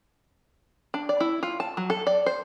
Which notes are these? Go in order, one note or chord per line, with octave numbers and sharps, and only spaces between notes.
D4
D5
E4
F4
A5
F#3
A4
D5
C5